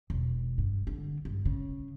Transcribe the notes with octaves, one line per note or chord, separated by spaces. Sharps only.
E1
G2
D3
G2
C#3